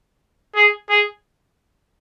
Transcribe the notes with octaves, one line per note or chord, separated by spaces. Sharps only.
G#4
G#4